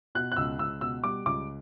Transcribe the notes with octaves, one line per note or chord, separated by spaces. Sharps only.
B2 F#6
F#6
C#2 E6
C#2 E6
B2 E6
G3 D6
C#2 D6